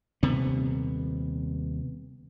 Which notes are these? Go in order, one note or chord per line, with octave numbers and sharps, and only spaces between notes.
D#1 C3 B3